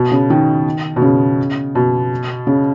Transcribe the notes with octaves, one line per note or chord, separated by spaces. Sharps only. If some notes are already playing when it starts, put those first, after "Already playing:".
Already playing: B2
C#3
D#3
B2
C#3
B2
C#3